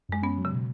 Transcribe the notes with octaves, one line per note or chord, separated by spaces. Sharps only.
F#2 G#3
B3 C#4
F#3
C#3
B2